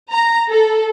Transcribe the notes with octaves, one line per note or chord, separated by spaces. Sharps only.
A#5
A4